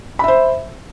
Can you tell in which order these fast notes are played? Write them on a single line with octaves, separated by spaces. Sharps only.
B5 E5 C5